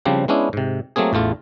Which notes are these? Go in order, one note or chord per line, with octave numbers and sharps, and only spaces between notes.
C#3 F3 G3 C4 D4
G#3 B3 C#4 D4 E4
G#2 C3
F#3 A3 A#3 C4 G#4
A1 E2 A3 F4